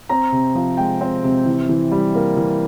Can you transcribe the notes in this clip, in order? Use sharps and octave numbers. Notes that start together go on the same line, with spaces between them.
C4 A#5
C3
F3
G#3 G5
C4
C3
E3
E3
G3
A#3
E3